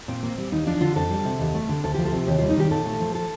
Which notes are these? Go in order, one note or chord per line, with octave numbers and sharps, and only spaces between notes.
A#2 C4
A#3
G3
D#2 D#4
F3 D4
D3 F4
F2 A4
G3
C3
D#2
A3
D3
D2 A4
F3 G4
A4
C3
D#2 G4
G3 F4
D#4
D#3 G4
A#2 A4
A3
F3
A4